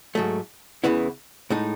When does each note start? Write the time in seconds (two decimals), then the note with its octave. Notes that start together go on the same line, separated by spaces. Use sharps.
0.15 G#2 F#3 A3
0.84 E2 C#3 E3 B3 E4
1.50 A2 G#3 D#4